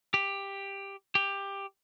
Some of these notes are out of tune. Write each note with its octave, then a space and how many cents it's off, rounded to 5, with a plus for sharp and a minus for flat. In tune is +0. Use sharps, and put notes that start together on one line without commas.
G4 +10
G4 +15